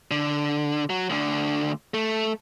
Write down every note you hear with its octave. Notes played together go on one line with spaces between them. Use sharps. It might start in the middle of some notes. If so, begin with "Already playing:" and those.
D3
F#3
D2 D3
A3